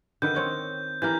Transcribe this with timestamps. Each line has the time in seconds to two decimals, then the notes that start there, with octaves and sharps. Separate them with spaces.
0.22 D3 D#3 B4 G6
0.35 C4 C#5 D#5
1.02 E3 G4 A#4 G6